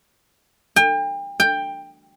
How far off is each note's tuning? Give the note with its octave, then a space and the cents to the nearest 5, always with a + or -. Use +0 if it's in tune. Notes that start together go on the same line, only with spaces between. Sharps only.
G5 +35
G5 +15